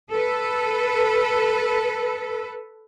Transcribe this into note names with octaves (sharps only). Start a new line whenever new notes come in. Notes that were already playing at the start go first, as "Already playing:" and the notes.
A4 B4